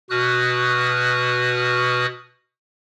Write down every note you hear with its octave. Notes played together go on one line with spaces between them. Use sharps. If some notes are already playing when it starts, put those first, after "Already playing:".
B2 F#4 B4 D#6 F6 F#6